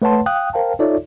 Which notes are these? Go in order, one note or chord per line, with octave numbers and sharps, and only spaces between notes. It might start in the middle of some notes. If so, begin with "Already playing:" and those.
A3 B4 C#5 F#5 A5 C6
F5 G5 D#6 F#6
A#4 C5 F5 G5 A5
D#4 F4 A4 C#5 D5 E5